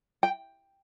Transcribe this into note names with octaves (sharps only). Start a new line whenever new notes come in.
G5